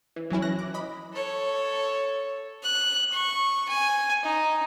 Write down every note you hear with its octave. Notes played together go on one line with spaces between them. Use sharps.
E3
E3 F#3 C#4 E4
F#6 A#6
D6
D#5 B5
A4 C#5
F#6
C#6
G#5
D#4